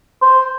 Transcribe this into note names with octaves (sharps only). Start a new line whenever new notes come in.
C5